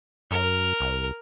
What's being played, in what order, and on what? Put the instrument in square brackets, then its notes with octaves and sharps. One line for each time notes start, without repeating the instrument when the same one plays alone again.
[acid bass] F#2 [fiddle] A#4
[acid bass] C2